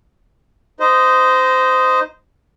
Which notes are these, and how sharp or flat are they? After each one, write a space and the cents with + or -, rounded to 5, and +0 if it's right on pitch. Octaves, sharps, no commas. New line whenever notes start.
D#4 +0 C5 -20 D#5 +0